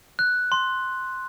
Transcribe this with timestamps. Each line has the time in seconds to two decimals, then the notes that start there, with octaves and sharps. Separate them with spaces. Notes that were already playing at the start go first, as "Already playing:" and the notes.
0.19 F#6
0.52 C6